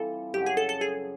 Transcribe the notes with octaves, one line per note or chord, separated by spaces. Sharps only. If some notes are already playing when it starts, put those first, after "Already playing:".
Already playing: E3 G3 C4 F4 A4
F#2 C#3 F#3 G4
G#4
A4
A4
G#4